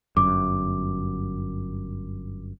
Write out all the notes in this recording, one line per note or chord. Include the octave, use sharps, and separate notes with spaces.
G1 F#2 D6